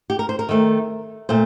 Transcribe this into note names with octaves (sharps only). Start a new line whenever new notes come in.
G4
A#4
C5
A#4
D#3 A3 C4
A#2 A3 C4 C5